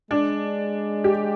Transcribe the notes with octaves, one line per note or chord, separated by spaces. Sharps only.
G#3 D4
G4